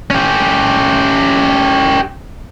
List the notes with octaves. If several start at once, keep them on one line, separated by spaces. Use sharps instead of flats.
C#4 G4